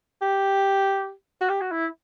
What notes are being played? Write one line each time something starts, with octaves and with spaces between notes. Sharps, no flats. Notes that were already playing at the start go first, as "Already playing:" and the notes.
G4
F#4
G4
F#4
E4